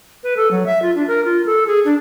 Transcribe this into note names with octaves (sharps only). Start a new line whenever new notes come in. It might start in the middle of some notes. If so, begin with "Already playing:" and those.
B4
A4
F#3
E5
F4
D4
A#4
F4
A4
G#4
D4